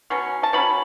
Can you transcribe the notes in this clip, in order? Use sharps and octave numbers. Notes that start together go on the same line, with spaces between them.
B2 F#3 C#4
A5
B2 F#3 C#4 B5